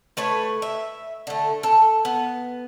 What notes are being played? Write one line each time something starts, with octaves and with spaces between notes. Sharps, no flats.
A3 B4 C#5
E5
D3 A3
A4
B3